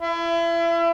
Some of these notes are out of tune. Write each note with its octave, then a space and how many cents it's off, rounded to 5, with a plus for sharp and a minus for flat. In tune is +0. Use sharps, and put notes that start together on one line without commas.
E4 +35